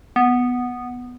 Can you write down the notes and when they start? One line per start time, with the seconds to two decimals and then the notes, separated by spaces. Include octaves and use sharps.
0.16 B3